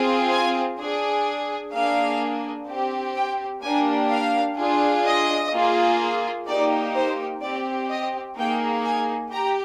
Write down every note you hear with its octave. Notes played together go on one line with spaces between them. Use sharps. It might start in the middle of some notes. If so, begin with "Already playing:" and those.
Already playing: C4 F4 G#4
G#5
D4 G#4
A#3 D4 G#4 F5
C4 G4
G5
A#3 D4 G4 G#5
F5
D4 F4 G#4
D#5
A#3 F4 G#4
A#3 D#4 G4 D5
C5
C4 G4 D5
D#5
A#3 D#4 G#4 G5
G#5
G4 A#5